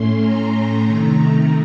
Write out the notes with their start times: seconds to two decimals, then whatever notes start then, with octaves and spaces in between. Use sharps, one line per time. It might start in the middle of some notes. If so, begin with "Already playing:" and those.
Already playing: A2 A3 C#4 C6
0.20 A#5
0.51 A#5
0.81 C3 D#3 A3